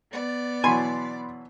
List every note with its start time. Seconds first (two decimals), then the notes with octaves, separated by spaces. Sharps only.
0.10 B3 D5
0.64 B2 E3 F#3 G#5 B5 C6